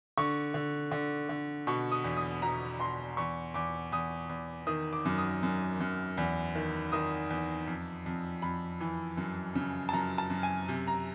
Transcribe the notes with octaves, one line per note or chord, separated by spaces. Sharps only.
D3 C#6
D3
D3
D3
B2 C#6
D#6
E2
D#6
B2 A#5
B2 C6
E2 C#6
E2 D6
E2 D#6
E2
D#3 D#6
D6
F#2
D#6
F#2
F#2
E2
D#3
D#3 D#6
E2
F2
F2
F2 B5
E3
F#2
C#3
A5
F#2 A#5
A5
F#2
G#5
C3
A#5